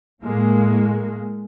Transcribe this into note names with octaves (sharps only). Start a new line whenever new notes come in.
A2 G#3 A#3